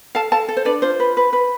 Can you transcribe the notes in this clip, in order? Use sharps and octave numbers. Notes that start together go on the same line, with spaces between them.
A4 F5 A5
A4 F5 A5
A4
C5
D4 B4 D5
F4 C5
B4
B4
B4